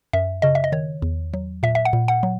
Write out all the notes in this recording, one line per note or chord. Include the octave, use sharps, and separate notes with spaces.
F#2 E5
C#3 D#5
E5
D#5
D#3 C#5
E2
F#3
A#2 E5
E5
F#5
A#2
F#5
F#3